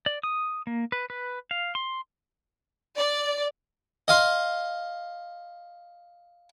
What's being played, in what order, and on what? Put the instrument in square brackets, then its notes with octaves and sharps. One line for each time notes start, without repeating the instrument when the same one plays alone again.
[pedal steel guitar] D5
D#6
A#3
B4
B4
F5
C6
[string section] D5
[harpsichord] D#5 F5 C6